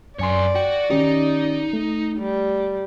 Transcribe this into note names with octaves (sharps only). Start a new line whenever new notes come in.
F#2 A#4 C#5 D5 G#5 C6
F#4 G5
D#3 C#4 D#4 G4
A3
G3